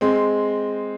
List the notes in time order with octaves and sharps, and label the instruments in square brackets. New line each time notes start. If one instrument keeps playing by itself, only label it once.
[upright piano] G#3 C4